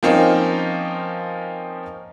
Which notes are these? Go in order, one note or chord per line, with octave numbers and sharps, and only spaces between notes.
F3 A#3 C4 C#4 D#4